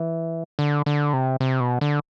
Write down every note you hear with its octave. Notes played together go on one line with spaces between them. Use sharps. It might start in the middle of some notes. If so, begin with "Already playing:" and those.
Already playing: E3
D3
D3
C3
C3
B2
D3